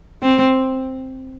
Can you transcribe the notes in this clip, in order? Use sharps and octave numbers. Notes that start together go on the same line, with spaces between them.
C4